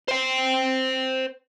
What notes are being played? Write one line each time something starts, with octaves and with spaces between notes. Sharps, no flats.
C5 G5